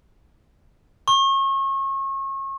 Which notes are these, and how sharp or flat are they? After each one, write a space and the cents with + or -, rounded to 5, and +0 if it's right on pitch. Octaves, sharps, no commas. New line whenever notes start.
C#6 -35